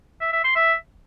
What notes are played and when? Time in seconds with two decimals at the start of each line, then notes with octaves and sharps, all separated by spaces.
0.21 E5
0.33 E5
0.44 C6
0.56 E5